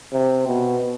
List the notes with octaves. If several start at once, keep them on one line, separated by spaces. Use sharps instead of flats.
C3
B2